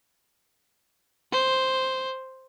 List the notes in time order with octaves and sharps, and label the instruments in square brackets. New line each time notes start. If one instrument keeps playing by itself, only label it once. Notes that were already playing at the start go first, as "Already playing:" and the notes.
[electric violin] C5